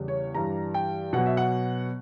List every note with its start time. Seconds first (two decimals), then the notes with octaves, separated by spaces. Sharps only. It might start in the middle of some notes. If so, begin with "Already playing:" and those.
Already playing: E2 C#3 G3
0.08 C#5
0.35 G2 E3 G3 A#5
0.74 G5
1.13 B2 F#3 F#5
1.26 E5
1.37 F#5